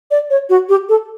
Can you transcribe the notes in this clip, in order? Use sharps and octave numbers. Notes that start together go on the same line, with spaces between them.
D5
C#5
F#4
G4
A4